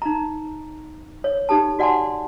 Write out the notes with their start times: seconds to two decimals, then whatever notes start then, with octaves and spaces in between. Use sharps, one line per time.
0.02 D#4 A#5
1.24 C#5
1.49 D#4 G4 A4 A5
1.79 F#4 D5 F#5 G#5 A5 C6